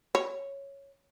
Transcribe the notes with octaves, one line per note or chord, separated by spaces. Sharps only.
C#5